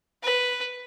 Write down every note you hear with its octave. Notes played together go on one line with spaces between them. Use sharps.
B4